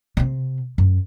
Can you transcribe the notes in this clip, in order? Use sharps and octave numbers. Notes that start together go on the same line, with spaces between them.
C3 C4
F#2